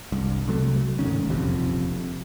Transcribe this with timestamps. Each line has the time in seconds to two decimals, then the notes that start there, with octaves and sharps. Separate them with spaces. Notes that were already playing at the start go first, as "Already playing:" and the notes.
0.12 C2 G2
0.48 C2 C3 F#3 A3
0.99 F#1 G#2 D#3 C#4
1.30 E1 A#1 F2 C3